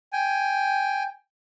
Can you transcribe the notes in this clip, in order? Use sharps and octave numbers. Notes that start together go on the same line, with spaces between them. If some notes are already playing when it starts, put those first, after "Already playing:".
G5 G#5